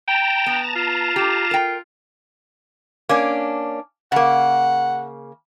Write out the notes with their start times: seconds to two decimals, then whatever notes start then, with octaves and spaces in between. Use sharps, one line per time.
0.08 G5 A5 A#5
0.46 B3
0.76 F4
1.16 G4
1.51 A#4 G5
3.09 A#3 C#4 D4
4.12 C#3 A#3 F#5